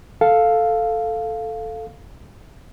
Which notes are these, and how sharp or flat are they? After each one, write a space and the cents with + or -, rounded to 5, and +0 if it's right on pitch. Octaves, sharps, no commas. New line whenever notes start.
A4 +0 F5 +0